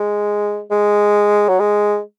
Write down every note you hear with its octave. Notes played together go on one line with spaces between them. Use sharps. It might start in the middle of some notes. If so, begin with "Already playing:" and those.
Already playing: G#3
G#3
F#3
G#3